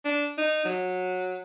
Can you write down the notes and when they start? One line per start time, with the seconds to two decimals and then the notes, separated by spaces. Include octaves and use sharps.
0.05 D4
0.38 D#4
0.65 F#3